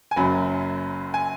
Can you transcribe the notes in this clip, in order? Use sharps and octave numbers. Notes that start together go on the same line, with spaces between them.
G#5
F#1 F#2 F#3 B5
G#5